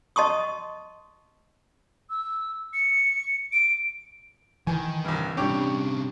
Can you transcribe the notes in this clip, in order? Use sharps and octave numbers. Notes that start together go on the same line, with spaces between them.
D#5 A5 C6 C#6 D#6
E6
C#7
D7
D#3 E3 G#5
C2 G2
C3 G3 C#4 D4 C#5 G5 D6